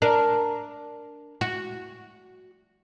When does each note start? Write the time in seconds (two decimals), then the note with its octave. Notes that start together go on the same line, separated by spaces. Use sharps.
0.02 D4 A#4
1.41 F#4